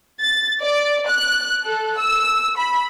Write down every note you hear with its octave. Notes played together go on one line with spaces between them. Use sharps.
A6
D5
F#6
A4
E6
B5